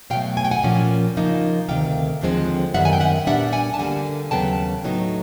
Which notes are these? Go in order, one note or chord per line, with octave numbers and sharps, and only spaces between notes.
B2 F#3 A3 F5 G5
G#5
G5
F#5 G#5
A#2 F3 A#3 C#4
C#3 F3 A#3 D#4
D2 C3 D#3 F5 G5
D#2 D3 F3 G#3 C4
F#2 D#3 G3 B3 E5 F#5
G#5
G5
E5 F#5
A#2 G3 B3 D4 E5 F#5
F#5 G#5
A5
D3 G3 A#3 F#5 G#5
D#2 C#3 F#3 B3 G5 A5
A2 F#3 B3 D#4